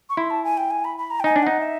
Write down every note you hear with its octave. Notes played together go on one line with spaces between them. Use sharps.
C#6
E4 C6
A5
G#5
G5
G#5
B5
B5
A#5
G5
D#4 G#5
D4
D#4 F#5
E5